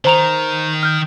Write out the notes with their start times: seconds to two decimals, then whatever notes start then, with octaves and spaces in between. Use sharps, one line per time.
0.05 D#3 C5 A#5 F7
0.83 F6 G6